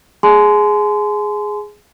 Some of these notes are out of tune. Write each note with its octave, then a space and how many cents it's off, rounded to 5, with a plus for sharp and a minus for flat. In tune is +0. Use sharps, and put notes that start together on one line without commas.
G#4 +0 G#5 +40 C6 -25